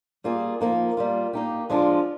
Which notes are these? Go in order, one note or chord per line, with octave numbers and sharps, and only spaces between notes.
G3 A#3 F4 G#4
F3 A#3 D#4
G3 A#3 F4
A#3 D#4 G4
F3 G#3 D4 F4